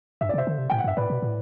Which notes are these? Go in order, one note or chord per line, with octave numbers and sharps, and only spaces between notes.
G2 E5
D5
C3
C5 E5
D3
C3
A2 G5
F#5
G2 E5
A2 B4 D5
B2
A2